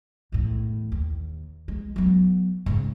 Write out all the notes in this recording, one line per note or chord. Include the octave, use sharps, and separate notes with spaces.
E2 A2
D#2
G#3
F#3 B3
G#2 C#3